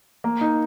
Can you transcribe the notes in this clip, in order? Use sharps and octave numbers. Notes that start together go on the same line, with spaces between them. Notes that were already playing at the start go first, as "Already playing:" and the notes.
A#3
D#4